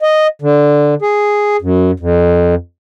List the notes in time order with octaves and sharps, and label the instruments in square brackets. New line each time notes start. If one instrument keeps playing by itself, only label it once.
[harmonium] D#5
D3
G#4
F#2
F2